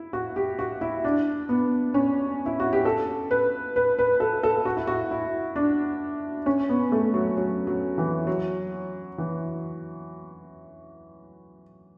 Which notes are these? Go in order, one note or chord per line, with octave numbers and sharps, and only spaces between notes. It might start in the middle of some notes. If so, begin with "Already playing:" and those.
Already playing: E4
F#4
G4
F#4
E4
D4
B3
C#4
E4
F#4
G4
A4
B4
B4
B4
A4
A4
F#4
E4
F#4
E4
D4
C#4
B3
A3
F#3
F#3
F#3
E3
F#3
E3